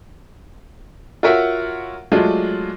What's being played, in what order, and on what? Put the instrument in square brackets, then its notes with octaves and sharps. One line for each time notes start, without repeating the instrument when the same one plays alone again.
[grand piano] F4 F#4 A#4 C#5 E5 F#5
F#3 G#3 A3 D4 F4